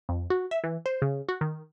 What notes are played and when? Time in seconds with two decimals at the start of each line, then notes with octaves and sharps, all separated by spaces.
0.09 F2
0.30 F#4
0.51 E5
0.64 E3
0.86 C5
1.02 C#3
1.29 F#4
1.41 D#3